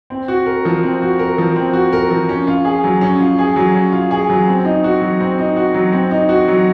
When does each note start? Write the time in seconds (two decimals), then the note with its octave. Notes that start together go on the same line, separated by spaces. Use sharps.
0.10 C4
0.28 F#4
0.46 A#4
0.65 F3
0.83 C4
1.02 F#4
1.19 A#4
1.38 F3
1.56 C4
1.73 F#4
1.93 A#4
2.10 F3
2.29 C#4
2.47 F4
2.65 G#4
2.84 F#3
3.01 C#4
3.20 F4
3.39 G#4
3.56 F#3
3.74 C#4
3.92 F4
4.11 G#4
4.30 F#3
4.48 C4
4.65 D#4
4.84 F#4
5.01 F#3
5.20 C4
5.39 D#4
5.56 F#4
5.74 F#3
5.93 C4
6.11 D#4
6.29 F#4
6.48 F#3